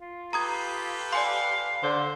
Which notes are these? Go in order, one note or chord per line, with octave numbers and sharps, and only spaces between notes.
F4
G4 A4 B4 A#5 D#6 G#6
D5 F5 G#5 C6
D3 C5